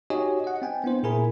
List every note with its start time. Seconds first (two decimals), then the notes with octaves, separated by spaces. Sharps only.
0.10 D#4 F#4 G4 C#5 D#5 G#5
0.44 D#5 F#5
0.62 C4 G5 G#5
0.84 B3 D4 E4 C5
1.03 A#2 E4 G#4 A#4 G#5 B5